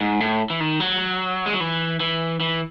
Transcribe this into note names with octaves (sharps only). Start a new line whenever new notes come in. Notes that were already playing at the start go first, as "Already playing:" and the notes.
G#2
A2
E3
D#3
F#3
G#3
F#3
E3
E3
E3